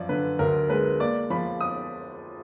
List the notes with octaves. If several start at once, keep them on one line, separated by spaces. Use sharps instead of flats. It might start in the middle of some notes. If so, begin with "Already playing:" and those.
Already playing: F#2 F3 D5
D3 B4
D2 A#4
G#3 B4
A#3 D5
F3 B5
D#6